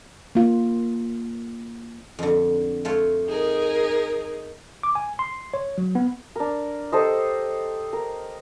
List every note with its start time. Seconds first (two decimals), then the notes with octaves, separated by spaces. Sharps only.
0.35 A#3 F4
2.19 F2 D3
2.85 A3 F4 C#5
3.27 D#4 G#4 A#4
4.83 D6
4.95 G#5
5.19 C6
5.54 C#5
5.78 F#3
5.95 B3
6.36 D4 A#4
6.92 G4 A4 C5 D#5
7.93 A#4